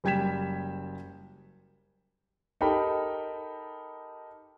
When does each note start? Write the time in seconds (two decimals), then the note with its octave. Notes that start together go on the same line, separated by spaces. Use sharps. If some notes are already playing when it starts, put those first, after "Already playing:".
0.04 F#1 G3 G5 G#6 B6 E7
2.61 D#4 G4 A4 A#4 G5 B5